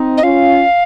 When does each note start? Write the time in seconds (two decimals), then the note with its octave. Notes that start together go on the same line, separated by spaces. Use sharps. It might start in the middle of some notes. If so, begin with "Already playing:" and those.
Already playing: C4 D#4
0.17 D#5
0.22 C#4 F4 F5